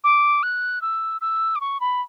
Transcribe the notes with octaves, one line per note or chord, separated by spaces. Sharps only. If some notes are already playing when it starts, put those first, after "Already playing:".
D6
F#6
E6
E6
D6
C#6
B5